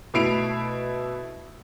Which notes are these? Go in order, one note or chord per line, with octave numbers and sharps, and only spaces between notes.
B2 A3 E4 C7 D7 F7